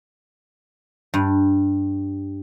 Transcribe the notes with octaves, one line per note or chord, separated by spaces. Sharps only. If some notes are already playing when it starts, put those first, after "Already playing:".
G2